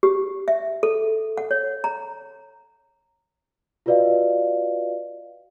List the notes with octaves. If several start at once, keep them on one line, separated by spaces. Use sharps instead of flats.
G4
E5
A4
F#5
C#5
A#5
F4 F#4 B4 D5 D#5 F5